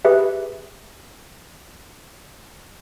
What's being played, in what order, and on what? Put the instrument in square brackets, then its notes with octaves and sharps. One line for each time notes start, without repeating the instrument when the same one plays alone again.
[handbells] G4 G#4 B4 E5